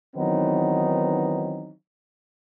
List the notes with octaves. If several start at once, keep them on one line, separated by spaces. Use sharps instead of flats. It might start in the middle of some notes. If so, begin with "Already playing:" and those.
D#3 E3 F#3 B3 C4 D#4